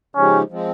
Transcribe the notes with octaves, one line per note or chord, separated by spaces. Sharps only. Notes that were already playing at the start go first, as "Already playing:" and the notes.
C#3 F3 G#3 C#4 D#4 G4
F3 G#3 C4